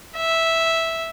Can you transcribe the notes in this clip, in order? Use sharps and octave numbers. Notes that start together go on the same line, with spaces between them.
E5